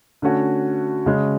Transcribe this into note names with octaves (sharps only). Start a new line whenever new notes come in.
D3 A3 C#4 F#4
C#3 G#3 C#4